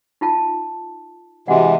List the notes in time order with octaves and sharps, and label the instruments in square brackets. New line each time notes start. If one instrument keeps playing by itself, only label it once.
[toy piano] D#4 F4 A5
[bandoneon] C3 E3 G#3 [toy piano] F#4 F#5